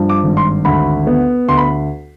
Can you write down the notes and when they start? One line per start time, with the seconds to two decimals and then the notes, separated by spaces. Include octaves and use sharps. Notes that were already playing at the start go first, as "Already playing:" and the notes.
Already playing: G2 F3
0.09 D6
0.23 G#1
0.37 C6
0.65 D2 B5
1.07 B3
1.48 D2 C6
1.58 B5